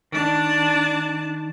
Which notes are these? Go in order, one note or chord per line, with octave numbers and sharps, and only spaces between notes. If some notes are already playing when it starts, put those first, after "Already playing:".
D#3 D4 A5